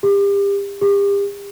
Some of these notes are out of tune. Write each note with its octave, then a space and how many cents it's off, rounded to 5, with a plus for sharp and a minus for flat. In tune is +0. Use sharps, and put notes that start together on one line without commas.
G4 +35
G4 +40